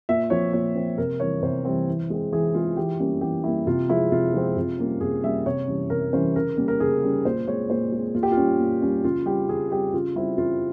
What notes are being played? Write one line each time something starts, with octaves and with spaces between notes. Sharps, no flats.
A#2 E5
F3 C4 C#5
A#2 C#5
F3 C4
C3 A#4
E3 G3 C4 C#5
C3 C5
E3 G3 C4
E3
G#3 C4
E3 G#4
G#3 C4 F4
E3 G4
G3 A#3 C#4
E3 G4
G3 A#3 C#4 E4
C3 F4
F3 G#3 C4 E4
C3 F4
F3 G#3 C4
C3
G3 A#3 C#4
C3 G#4
G3 A#3 C#4 E5
C3 C#5
E3 G3 C#4
C3 A#4
E3 G3 C#4 C5
C#3 A#4
G3 A#3 C#4
A#4
C#3 G#4
G3 A#3 C#4
A#2 C5
G#3 C4 C#5
A#2 C5
G#3 C4
A#2 F4
G4
F4
G3 C#4
A#2
G3 C#4
C#3 F4
G3 C4 G4
C#3 G#4
G3 C4 G4
C#3 F4
G3 C4 E4
C#3 F4